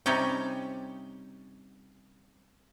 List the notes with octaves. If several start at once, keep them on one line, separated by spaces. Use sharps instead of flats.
C3 G3 C#4 D#4 G5